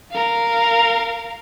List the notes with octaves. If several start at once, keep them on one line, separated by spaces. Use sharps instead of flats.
A#4 F5